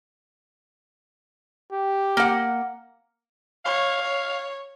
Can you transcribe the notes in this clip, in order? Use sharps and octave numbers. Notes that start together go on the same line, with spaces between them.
G4
A#3 F#5
C#5 F5
C#5